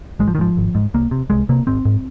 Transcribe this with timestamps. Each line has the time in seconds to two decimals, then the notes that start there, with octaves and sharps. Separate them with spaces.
0.19 G#1 G#3
0.28 F3
0.35 D#3
0.38 G#2 F3
0.57 G#1
0.75 G#2
0.94 C2 A#3
1.11 C3
1.30 C2 G#3
1.49 C3 A#3
1.67 G#1 C4
1.85 G#2